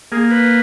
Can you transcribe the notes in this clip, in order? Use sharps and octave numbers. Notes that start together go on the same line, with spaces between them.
A#3 G#4
B4